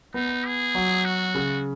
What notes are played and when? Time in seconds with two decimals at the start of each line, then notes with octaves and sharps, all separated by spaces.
0.14 B3 D#4
0.45 G#4
0.75 F#3
1.05 F#4
1.35 C#3